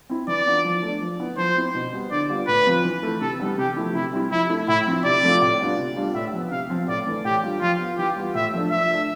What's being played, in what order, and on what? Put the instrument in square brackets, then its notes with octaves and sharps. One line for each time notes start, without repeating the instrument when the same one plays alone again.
[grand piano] C4 E4
[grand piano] E3 [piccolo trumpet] D5
[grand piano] B3 D4 F4
F3
A3 D4
F3
B3 E4
[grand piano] F3 [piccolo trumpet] C5
[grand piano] C4 E4
B2
G3 B3
[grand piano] D3 [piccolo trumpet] D5
[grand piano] G3 B3 F4
[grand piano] A2 [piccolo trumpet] B4
[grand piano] F3 C4 F4
E3
A3 E4
[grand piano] C3 [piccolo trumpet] A4
[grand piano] E3 G3 B3
[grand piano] C3 [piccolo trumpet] G4
[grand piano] F3 A3 E4
[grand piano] C3 [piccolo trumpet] E4
[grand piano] G3 C4 E4
[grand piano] F3 [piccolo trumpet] E4
[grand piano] A3 E4
[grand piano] A2 [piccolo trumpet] E4
[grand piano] F3 C4 E4
[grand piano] C3 [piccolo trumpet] D5
[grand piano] F3 A3 C4 F4
A2
G3 B3 D4 F4
C3
G3 D4 F4
[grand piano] A2 [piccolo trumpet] E5
[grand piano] F3 B3
[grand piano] C3 [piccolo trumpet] F5
[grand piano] F3 C4 F4
[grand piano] A2 [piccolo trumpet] D5
[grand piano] E3 A3
[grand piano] A2 [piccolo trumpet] G4
[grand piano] G3 D4 F4
[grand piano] F3 [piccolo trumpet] F4
[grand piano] B3 F4
[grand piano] E3 [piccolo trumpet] G4
[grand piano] G3 B3 F4
[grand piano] A2 [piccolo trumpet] E5
[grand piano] F3 A3 D4
[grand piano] F3 [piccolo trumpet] E5
[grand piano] A3 D4